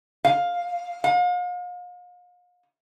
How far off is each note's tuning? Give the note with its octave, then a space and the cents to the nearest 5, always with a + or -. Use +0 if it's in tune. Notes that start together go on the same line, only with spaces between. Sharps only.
F5 +10
F5 +40